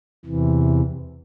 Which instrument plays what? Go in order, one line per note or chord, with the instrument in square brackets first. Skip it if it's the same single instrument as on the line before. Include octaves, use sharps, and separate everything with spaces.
[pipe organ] E2 C3 E3